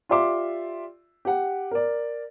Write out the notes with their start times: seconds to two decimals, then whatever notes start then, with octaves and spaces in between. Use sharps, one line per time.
0.09 F4 G4 D5 E5 C6 D6
1.25 G4 F#5
1.71 A#4 D5